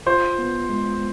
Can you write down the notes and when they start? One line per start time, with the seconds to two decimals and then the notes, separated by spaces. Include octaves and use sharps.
0.06 F4 C5
0.39 B3
0.69 G#3